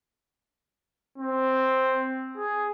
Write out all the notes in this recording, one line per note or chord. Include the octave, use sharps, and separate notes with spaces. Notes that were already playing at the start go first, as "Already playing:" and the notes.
C4
G#4